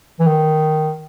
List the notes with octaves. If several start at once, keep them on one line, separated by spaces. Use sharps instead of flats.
E3
D#3